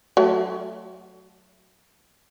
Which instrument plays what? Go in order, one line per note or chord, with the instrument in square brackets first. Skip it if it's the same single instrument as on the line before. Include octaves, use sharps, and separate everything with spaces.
[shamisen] F#3 A3